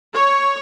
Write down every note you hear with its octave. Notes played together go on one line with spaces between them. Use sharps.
C#5